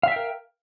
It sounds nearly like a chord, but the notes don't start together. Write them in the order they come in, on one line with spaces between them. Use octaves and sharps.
F5 E5 G5 A#4